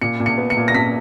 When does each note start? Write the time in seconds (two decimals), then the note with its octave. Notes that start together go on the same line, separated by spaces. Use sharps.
0.01 A#2 C#7
0.20 A#2
0.26 C#7
0.38 B3
0.50 C#7
0.57 A#2
0.68 A#6
0.74 A#2 B6